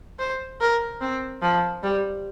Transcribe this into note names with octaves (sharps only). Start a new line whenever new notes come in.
C5
A#4
C4
F3
G3